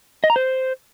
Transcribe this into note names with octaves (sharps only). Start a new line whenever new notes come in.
D#5
A#5
C5